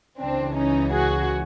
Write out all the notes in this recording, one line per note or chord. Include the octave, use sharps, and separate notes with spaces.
C#2 C#3 E3 C4 D4
C#4 D#4
F#4 G#4